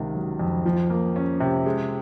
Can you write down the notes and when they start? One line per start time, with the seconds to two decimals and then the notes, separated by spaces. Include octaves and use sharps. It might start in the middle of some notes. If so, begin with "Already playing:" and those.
Already playing: C#2 C3 D#3
0.15 F#3
0.39 F2
0.66 F3
0.90 A#3
1.16 C#4
1.40 C3
1.66 G#3